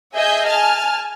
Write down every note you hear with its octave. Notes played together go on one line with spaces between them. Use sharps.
G#4 D#5 E5 G#5 G6
G#5 A5 F6